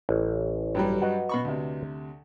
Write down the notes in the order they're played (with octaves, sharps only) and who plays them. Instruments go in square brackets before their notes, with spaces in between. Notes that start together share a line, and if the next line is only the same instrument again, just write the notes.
[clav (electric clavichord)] A1
[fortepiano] G2 F#3 G3
[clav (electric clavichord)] F#4 B4 D#5
[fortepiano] B2 B5 C#6
D2 C3